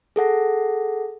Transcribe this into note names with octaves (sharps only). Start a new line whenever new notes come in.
G#4 A4 F#5 A#6